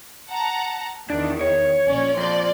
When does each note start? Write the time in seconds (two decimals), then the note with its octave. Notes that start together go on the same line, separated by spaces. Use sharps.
0.28 F#5 A5 A#5
1.10 E2 D#3 D4
1.41 C#5
1.87 A#1 C#4 D5
2.17 F2 D5 C6